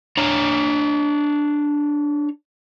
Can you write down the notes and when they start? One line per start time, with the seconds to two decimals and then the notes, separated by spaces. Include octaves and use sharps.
0.17 D4 C#5 A#5